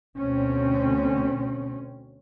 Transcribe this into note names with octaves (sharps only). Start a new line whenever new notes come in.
D2 B2 C4 C#4